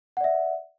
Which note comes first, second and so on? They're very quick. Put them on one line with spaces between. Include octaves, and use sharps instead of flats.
F#5 D5 E5